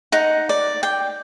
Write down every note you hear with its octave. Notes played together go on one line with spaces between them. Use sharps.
D#4 F#5
D5
G5